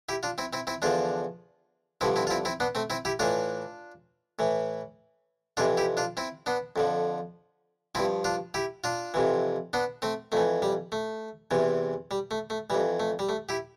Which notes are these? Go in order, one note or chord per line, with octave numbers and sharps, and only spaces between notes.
E4 G4
D4 F4
C4 E4
C4 E4
C4 E4
E2 D3 F3 D4 F4
G2 D3 F3 C4 E4
C4 E4
F4
C4 E4
C4 E4
B3 D4
A3 C4
C4 E4
E4 G4
A2 E3 D4 F4
A2 E3
F2 C3 E3 D4 F4
E4 G4
D4 F4
C4 E4
B3 D4
F2 D3 F3
G2 F3 C4 E4
D4 F4
E4 G4
D4 F4
F2 C3 E3
B3 D4
A3 C4
F2 E3 A3
G3
A3
E2 C3 E3
G3
A3
A3
F2 E3 G3
A3
G3
A3
E4 G4